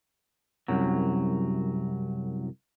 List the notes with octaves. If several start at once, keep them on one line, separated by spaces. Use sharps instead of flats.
C2 F#2 F#3